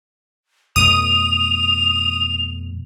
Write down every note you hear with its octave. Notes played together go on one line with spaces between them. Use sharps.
F2 B2 A3 D#6 D#7 F7